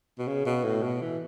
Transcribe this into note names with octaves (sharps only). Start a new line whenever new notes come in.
B2
C#3
B2
A2
B2
E3